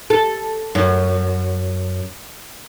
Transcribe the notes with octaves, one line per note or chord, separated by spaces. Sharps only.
A4
F#2